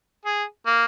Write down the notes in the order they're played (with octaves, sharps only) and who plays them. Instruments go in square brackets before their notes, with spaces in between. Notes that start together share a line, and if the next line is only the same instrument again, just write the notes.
[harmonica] G#4
A#3